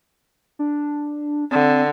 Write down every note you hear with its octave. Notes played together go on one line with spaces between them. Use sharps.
D4
D3 C4